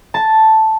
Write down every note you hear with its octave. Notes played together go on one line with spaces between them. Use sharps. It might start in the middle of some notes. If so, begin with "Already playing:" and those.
A5